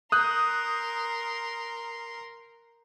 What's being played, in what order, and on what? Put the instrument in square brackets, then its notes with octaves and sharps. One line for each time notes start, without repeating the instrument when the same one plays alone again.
[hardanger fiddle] A#4 C6 [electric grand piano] D#6 F#6 G6